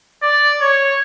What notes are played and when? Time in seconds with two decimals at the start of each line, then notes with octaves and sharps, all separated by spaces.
0.22 D5
0.61 C#5